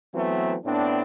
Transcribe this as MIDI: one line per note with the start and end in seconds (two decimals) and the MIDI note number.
0.14 0.56 52
0.14 0.56 54
0.14 0.56 57
0.14 0.56 59
0.14 0.56 60
0.65 1.02 45
0.65 1.02 59
0.65 1.02 60
0.65 1.02 62